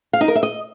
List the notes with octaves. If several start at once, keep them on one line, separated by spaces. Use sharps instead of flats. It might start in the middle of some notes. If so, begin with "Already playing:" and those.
F5
D#4
A#4
E5
D#5